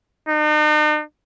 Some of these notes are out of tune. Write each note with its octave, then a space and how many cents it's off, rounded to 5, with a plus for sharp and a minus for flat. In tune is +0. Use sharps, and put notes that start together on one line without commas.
D#4 -45